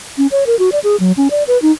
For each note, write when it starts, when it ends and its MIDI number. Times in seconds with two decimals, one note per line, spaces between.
0.18 0.27 61
0.31 0.44 73
0.47 0.58 70
0.59 0.70 66
0.72 0.79 74
0.84 0.96 68
1.00 1.12 54
1.17 1.28 61
1.31 1.43 74
1.48 1.60 71
1.62 1.72 63